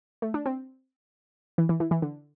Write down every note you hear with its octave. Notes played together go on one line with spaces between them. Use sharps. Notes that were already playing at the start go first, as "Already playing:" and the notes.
A3
D4
C4
E3
E3
E3
E3
D3